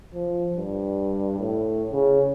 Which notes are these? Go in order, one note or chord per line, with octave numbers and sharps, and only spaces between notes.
F3
G2
A2
C#3